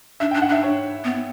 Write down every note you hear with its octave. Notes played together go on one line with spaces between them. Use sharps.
D4 E5
D4 G5
F#5
D4 E5
C#5
B3